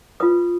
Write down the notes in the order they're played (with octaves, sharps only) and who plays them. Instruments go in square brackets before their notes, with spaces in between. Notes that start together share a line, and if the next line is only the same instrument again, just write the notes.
[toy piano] F4 B4 D#6